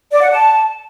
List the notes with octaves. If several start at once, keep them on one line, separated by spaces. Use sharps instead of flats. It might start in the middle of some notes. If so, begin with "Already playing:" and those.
D5
F#5
A5